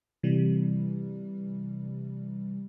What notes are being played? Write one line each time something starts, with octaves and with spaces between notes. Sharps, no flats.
C3 E3 G3